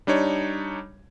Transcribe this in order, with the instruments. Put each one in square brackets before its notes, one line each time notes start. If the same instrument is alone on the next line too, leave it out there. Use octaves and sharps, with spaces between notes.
[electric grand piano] G3 D4 D#4 C#5